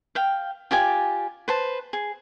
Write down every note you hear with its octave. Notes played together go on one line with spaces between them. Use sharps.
F5 G5
F4 G4 D5 G#5
B4 C5 A5
G#4